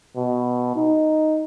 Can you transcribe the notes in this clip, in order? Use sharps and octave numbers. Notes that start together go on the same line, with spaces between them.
B2
D#4